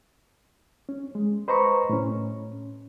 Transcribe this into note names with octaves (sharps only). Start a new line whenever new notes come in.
C#4
G#3
B4 C5 D#5 A#5 B5 C#6
A2 C#4